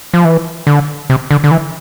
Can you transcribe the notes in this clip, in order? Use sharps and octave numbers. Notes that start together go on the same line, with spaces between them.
F3
E3
D3
C3
D3
D3
E3